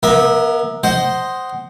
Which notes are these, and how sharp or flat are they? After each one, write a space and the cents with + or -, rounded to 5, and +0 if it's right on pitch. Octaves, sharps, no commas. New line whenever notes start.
B3 -40 A#4 +0 E5 -15
C5 +0 D#5 +0 F#5 +25